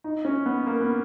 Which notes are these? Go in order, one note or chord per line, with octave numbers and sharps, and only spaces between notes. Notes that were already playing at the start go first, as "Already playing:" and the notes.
D#4
C#4
B3
A#3
B3